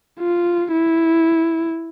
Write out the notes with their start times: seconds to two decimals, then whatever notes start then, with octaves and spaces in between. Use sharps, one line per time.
0.20 F4
0.72 E4